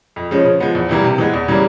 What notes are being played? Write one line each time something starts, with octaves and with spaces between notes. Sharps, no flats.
F2
C#3 F3 G#3 C#4
C#3
F3 G#3 B3
E2
C3 E3 G3 A#3
C3
E3 G#3 B3
E2
C#3 E3 G3 A#3